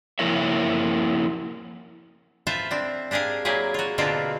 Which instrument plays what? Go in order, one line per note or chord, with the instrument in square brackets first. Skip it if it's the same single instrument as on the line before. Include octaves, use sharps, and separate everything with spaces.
[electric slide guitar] F3 A#3 E4 A#4 C#5 E5
[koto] F4 A4 B4 C5 E5
C4 D4
D4 G4 G#4 A#4 F5
F#3 A#3 E4 G4 G#4
F4 F#4
B2 D3 A#3 C4 D4 F4